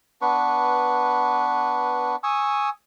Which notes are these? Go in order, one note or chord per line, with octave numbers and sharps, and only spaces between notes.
B3 D4 B4 C#6
G#5 C#6 D#6 E6